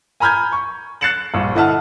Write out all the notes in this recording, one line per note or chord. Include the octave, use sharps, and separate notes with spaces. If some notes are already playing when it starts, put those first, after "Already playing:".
G#5 A#5 B5 F6 G6 G#6
C#6
F#6 A6 C7 C#7 E7 F#7
A#1 G2
D3 E4 D#5 F#5 A5 F6